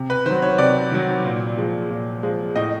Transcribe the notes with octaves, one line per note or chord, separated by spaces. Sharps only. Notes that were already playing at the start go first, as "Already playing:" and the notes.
Already playing: C3
B4
D#3 F#3 C5
C#5
C3 D5
D#3 F#3
A#2
F3 G#3
A#2
F3 G#3
A2 D#5